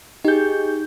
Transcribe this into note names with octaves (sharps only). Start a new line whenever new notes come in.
D#4 G4 G#4 G6